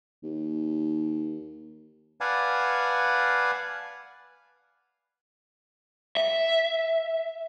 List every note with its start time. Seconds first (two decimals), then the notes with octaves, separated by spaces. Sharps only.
0.23 D#2
2.21 B4 D5 F5 F#5 G#5 A5
6.17 E5